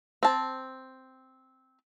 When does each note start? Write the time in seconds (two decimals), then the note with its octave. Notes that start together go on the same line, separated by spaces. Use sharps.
0.23 C4 A5